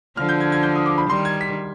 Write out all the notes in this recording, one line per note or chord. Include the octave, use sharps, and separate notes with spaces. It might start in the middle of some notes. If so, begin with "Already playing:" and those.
D3 F3 F6
G6
G#6
G#6
G6
D#6
D6
B5
D#3 G3 C6
G#6
B6